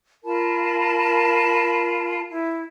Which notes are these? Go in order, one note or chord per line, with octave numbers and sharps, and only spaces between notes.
F4 A#4 A5 B5
E4